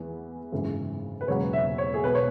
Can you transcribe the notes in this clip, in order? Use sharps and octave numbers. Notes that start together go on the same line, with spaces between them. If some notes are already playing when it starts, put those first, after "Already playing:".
Already playing: E2 E3 B3
G#1 F#2 C#3 E3 G#3
B4
E1 E2 C#3 F#3 B3 C#5
E5
C#5
G#4
B1 B2 B3 B4
C#5